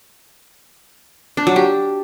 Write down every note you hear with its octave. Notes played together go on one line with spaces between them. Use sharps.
D4
F#3
G4